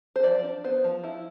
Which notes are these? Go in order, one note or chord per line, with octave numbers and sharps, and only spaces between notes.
C5
F3 D5
D4
B3 C5
F3
F3 E4